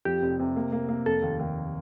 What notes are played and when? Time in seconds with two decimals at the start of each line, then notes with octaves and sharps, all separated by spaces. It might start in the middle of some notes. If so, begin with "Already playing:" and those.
0.05 F2 G4
0.22 F1
0.39 C3
0.56 A#3
0.72 A#3
0.89 A#3
1.06 F1 A4
1.22 D#2
1.39 D#2